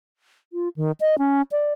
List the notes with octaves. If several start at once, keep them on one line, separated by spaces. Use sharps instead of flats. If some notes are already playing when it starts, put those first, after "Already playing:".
F4
D#3
D#5
C#4
D5